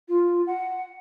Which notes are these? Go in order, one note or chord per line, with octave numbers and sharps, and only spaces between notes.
F4
F#5